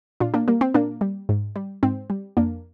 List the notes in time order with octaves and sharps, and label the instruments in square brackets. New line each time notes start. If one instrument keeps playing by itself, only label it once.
[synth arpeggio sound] A#2 D4 F4
A#3 D4
G3 A#3
C4
A#2 A#3 D4
G3
G#2
G3
G#2 C4
G3
F2 A#3 D4